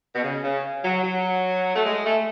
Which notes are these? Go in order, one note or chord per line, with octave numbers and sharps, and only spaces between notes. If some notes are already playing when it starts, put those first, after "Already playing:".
B2
C#3
C#3
F#3
F#3
A3
G#3
A3